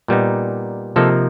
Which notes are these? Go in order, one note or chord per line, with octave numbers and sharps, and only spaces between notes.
A#2 G3 B3 D#4
C3 F3 A#3 D#4 A4